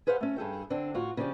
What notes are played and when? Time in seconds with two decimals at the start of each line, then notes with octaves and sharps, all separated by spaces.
0.07 G#4 B4 C5 F5 F#5
0.21 A3 C#4
0.37 G2 G#4 A4 G5
0.70 D3 C4 D4
0.94 A2 F4 F#4
1.17 C#3 F3 C#4 D4 G4